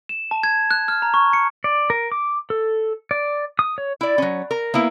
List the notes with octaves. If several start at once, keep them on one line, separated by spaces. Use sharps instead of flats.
E7
A5
G#6
F#6
F6
A#5
C#6
C#7
D5
A#4
D6
A4
D5
D#6
C#5
E4 D5
F#3 C#4
A#4
A#3 B3 E4